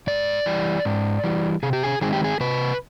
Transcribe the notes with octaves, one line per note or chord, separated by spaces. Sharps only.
G#2 D5
E3 G3
G#2
E3 G3
C3 G#4
G4
G#4
D#3 G#3 C4 G#4
G4
G#4
C3 B4